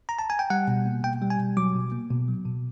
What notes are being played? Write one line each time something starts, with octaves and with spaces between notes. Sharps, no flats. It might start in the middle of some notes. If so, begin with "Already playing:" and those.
A#5
A5
G#5
G5
G3 F#5
B2
A#3
B2 G5
G3
G#5
B2
F#3 D6
B2
A#3
B2
F#3
B2